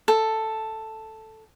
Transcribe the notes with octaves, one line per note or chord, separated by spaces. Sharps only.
A4